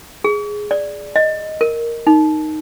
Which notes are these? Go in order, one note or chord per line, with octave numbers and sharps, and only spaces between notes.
G#4
D5
D#5
A#4
D#4